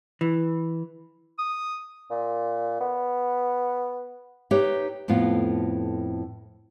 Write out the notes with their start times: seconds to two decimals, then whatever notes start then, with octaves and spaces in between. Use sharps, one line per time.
0.21 E3
1.39 D#6
2.11 A#2
2.81 B3
4.51 D#4 G4 B4 C#5 E5
5.08 F2 A2 B3 F4